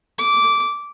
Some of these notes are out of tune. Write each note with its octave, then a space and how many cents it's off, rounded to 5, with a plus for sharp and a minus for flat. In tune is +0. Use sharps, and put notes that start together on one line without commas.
D6 -15